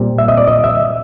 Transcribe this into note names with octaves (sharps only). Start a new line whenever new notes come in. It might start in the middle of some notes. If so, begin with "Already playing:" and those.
Already playing: A#2 G3 C4
E5
D#5
D5
D#5
E5